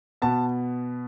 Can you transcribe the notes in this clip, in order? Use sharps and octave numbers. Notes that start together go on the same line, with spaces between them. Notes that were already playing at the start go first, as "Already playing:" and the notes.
B2 B3 A5